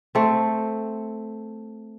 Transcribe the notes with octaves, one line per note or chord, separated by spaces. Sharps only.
A3 C4